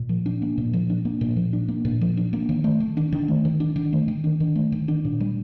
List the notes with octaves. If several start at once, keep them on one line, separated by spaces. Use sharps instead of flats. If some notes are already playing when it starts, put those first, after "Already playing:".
Already playing: A#2
F3
D4
A#3
A#2
F3
D4
A#3
A#2
F3
D4
A#3
A#2
F3
D4
A#3
D#3
A3
D#3
D4
D#3
A3
D#3
D4
D#3
A3
D#3
D4
D#3
A3
D#3
D4
A#2
G3